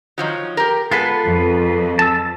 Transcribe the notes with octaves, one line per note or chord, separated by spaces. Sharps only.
D#3 F3 F#3
G4 A#4
G#3 B3 F4 A4 B4
F2
A5 E6